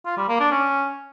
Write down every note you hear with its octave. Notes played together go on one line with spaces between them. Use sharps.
F4
G3
A#3
D4
C#4